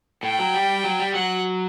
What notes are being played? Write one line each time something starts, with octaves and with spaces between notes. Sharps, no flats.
A2 G5
F#3
G3
F#3
G3
F#3 F#5